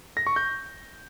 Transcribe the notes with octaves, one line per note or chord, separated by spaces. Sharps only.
A#6
C#6
G6